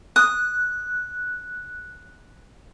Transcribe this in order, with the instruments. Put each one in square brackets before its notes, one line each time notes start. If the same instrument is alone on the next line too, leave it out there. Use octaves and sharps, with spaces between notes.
[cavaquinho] D#6 [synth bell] F#6